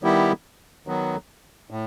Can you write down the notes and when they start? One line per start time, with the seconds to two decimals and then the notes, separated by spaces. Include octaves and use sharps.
0.03 D#3 G3 B3 E4 G4
0.87 D#3 F#3 B3
1.71 A2